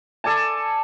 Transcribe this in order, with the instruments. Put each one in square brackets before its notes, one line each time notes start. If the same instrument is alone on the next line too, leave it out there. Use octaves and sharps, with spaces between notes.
[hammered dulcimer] A4 D5 G#5 A5